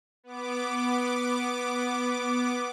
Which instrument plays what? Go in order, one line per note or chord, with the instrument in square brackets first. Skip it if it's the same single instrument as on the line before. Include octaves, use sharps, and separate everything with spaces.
[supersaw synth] B3 D6